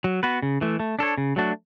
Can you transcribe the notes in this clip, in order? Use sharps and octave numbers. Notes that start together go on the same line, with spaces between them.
F#3
B3 F#4 B4
C#3
E3 A3
A3
D4 A4 C#5
C#3
F#3 A3 D4 F#4